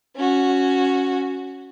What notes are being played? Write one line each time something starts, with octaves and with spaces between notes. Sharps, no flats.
C#4 F#4